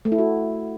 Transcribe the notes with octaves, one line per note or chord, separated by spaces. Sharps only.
A3
E4
F#4